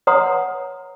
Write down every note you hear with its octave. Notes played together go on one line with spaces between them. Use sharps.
B4 C#5 F#5 A#5 C6 D#6